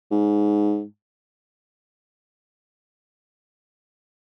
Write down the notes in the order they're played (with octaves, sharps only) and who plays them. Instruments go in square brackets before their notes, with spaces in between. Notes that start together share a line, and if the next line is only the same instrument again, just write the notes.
[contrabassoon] G#2